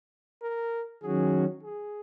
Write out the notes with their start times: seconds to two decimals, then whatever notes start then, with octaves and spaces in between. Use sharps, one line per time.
0.42 A#4
1.02 D#3 F#3 C#4 F#4 G#4
1.63 G#4